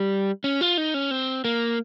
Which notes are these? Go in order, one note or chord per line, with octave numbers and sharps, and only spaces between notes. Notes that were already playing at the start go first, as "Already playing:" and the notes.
Already playing: G3
C#4
F4
D#4
C#4
C4
A#3